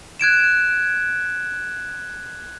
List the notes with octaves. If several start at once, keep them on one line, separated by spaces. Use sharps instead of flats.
F#6 G#6 D7 E7